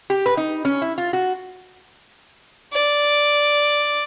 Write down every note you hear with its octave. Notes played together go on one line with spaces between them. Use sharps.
G4
B4
D#4
C#4
E4
F4
F#4
D5